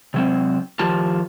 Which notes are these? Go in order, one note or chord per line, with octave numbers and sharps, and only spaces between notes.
C3 F#3 C4
D#3 F3 F4 G4 A5